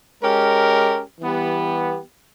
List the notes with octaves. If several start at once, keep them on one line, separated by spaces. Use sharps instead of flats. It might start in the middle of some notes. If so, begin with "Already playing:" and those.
G#3 C#4 G4 A#4
E3 G3 B3 G4